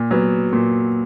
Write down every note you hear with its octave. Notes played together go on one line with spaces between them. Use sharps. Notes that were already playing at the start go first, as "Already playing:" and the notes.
Already playing: A#2
F#3 B3
A#2